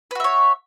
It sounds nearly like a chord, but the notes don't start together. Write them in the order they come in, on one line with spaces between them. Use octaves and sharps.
B4 F#4 E5 C#5